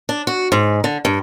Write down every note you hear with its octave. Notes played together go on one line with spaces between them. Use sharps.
D4
F#4
G#2
D3
G2